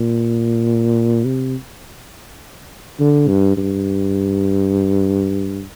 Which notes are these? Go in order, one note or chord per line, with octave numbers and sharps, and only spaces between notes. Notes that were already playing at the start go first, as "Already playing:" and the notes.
Already playing: A#2
C3
D3
G2
G2